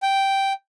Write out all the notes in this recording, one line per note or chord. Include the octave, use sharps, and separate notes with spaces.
G5